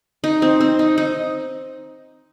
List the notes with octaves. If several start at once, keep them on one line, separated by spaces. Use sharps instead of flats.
D#4
C4
C4
D#4
D#4